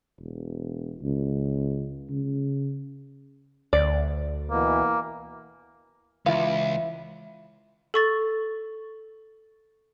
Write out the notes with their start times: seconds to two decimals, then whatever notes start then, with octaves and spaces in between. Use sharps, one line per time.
0.19 E1
1.03 C#2
2.09 C#3
3.73 D2 D5
4.51 B2 E3 A#3
6.26 C#2 E3 F4 E5 F5 B5
7.94 A4 C#6 A6